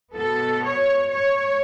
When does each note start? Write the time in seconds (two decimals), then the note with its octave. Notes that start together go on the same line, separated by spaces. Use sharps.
0.15 B2 B3 A4
0.63 C#5
1.11 C#5